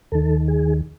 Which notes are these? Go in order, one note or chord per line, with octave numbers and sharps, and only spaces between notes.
D#2 D#3 A4
G#4